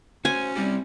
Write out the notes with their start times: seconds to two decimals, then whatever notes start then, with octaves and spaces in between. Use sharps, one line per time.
0.25 C#4 F#4 C5 G#5
0.56 G3 C4 E4 G4